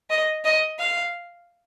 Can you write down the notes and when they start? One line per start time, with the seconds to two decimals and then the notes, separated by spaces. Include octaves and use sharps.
0.10 D#5
0.45 D#5
0.79 F5